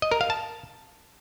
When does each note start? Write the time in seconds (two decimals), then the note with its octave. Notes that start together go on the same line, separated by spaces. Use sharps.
0.02 D#5
0.11 A#4
0.21 F5
0.30 A5